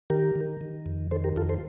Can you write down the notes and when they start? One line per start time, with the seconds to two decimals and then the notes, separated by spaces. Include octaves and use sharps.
0.10 D#3 G4 A#4
0.36 D#3
0.61 D#3
0.86 F2
1.11 D#3 A4 C5
1.24 G4 A#4
1.36 F2 F4 A4
1.49 A4 C5